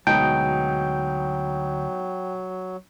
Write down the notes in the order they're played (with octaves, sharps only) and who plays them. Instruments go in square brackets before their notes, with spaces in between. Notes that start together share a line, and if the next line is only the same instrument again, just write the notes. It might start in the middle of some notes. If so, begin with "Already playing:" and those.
[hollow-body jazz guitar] D2 A5 [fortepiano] B2 G#3 D#4 [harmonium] F#3 [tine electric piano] G5